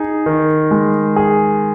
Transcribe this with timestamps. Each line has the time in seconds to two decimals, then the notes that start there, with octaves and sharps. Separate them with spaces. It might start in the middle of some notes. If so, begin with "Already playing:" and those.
Already playing: D#4 G#4
0.26 D#3
0.71 G#3
1.16 G#4